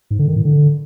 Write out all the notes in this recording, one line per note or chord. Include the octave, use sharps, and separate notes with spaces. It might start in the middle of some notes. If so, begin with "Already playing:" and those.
G#2
D3
D#3
A2
D3